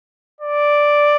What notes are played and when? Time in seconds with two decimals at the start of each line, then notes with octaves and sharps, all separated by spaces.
0.41 D5